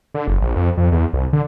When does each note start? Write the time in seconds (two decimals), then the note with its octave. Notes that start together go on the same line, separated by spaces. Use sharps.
0.14 D3
0.27 F#1
0.42 A#1
0.56 F2
0.77 F2
0.92 E2
1.13 C2
1.33 D3